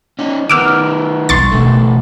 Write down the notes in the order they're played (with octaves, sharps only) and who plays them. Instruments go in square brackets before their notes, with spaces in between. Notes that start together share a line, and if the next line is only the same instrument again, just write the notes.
[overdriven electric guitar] C#4 D#4
[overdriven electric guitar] D#3 B3 [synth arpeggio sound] D6 E6 F6
[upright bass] B1 G3 [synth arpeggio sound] C6 C#6 A6
[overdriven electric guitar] E2 A3 [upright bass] B2 D4